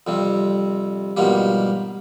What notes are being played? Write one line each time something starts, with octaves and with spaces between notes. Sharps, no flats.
F2 C3 G3
G#2 B2 F3 G3 A#3 G4